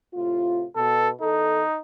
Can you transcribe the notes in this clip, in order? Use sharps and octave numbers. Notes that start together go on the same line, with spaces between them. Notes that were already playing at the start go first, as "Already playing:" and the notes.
A2 C3 F4
B2 A4
E2 D#4 A4